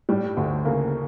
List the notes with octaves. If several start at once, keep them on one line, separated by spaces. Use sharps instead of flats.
A2 G3
D2
C#3 A#3